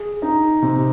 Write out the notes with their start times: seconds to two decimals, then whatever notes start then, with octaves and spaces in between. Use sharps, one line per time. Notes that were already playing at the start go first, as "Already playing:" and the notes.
Already playing: G#4
0.22 D#4
0.62 C3